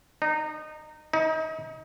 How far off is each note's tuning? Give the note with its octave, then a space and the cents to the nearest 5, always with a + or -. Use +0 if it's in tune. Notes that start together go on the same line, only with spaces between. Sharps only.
D#4 -25
D#4 +30